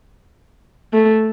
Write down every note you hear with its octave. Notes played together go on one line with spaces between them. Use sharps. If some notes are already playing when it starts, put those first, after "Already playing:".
A3